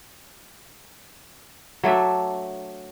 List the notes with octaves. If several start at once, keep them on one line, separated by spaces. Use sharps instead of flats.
F#3 A3 D4 E5